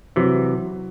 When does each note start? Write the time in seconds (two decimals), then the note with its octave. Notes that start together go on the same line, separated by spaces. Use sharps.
0.16 C3 E3 F#3